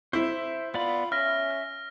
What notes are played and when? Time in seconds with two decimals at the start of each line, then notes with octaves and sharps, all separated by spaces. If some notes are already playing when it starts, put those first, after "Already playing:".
0.13 E4 C5 E5
0.74 B3 F4 D5 B5
1.12 C#4 E5 F6 A#6
1.51 F6